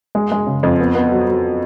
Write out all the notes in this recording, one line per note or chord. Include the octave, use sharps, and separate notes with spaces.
G#3
G#3
C#3
F2
B3
B3
F#3
F#3